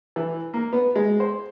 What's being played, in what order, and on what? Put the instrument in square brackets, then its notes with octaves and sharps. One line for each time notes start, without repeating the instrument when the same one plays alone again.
[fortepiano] E3
A#3
B3
G#3
C5